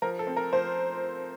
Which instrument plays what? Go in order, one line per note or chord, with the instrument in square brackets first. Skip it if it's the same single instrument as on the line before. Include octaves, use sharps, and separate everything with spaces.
[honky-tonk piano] F3 A#4
A4
C4
A#4
F3 C5